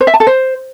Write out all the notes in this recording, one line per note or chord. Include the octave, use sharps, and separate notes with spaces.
C5
E5
A5
A4
C5